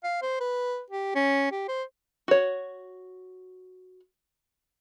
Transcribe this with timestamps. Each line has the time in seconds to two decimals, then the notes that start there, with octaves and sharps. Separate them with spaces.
0.04 F5
0.22 C5
0.40 B4
0.91 G4
1.15 C#4
1.51 G4
1.68 C5
2.28 F#4 C#5